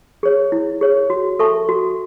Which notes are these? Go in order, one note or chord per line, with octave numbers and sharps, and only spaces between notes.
G#4 C#5
E4
G#4 C#5
F#4
A4 E5 A5 C#6
F#4